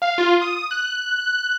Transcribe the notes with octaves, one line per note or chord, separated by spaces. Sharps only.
F5
F4
D#6
F#6